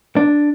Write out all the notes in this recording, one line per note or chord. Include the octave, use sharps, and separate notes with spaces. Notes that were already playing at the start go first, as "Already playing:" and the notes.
D4